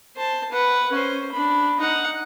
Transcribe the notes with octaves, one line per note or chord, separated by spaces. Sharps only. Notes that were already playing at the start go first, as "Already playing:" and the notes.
C5 A5
B4 F#5
C#4 C5
D4 B5
D#4 F#5